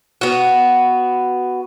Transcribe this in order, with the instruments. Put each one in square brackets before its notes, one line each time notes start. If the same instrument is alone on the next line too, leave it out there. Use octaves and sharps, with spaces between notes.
[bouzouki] B3 F#4